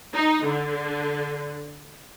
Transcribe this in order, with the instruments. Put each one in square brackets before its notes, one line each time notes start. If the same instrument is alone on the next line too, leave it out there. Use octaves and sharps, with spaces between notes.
[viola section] D#4
D3